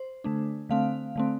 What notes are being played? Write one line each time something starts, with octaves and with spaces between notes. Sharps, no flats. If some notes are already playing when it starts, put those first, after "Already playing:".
Already playing: C5
D3 A3 D4
D3 A3 C4 F5
D3 A3 C4